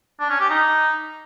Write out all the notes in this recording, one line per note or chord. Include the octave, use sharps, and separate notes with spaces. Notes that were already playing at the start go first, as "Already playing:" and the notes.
D4
C#4
G4
D#4